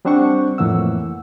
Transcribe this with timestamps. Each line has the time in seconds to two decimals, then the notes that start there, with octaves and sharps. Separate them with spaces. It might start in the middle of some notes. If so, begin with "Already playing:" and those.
0.05 G3 C4 D4 C5 F#5 C#6
0.58 F2 A2 E3 A#3 F#5 E6